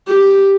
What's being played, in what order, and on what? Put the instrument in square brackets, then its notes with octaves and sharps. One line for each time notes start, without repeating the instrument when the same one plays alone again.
[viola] G4